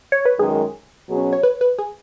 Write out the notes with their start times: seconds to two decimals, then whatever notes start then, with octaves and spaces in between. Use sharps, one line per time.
0.12 C#5
0.25 B4
0.39 F#2 D#3 G#3 G#4
1.09 B2 F#3 C#4 G#4
1.33 C#5
1.43 B4
1.61 B4
1.78 G#4